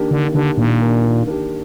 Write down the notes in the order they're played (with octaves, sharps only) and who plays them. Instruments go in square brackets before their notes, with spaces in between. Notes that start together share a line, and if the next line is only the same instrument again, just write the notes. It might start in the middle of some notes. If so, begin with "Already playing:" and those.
Already playing: [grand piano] D#3 A#3 D4 G4
[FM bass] D3 [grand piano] D#3
[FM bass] D3 [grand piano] A#3 D4 G4
[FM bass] A#2 [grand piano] D#3
[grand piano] A#3 D4 G4
D#3
A#3 D4 G4